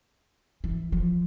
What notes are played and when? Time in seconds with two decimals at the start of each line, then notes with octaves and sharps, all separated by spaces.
0.64 E3
0.92 F3